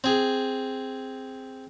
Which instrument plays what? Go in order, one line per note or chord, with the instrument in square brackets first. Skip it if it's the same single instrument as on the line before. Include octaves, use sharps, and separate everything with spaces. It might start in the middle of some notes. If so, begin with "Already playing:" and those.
[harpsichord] C4 G#4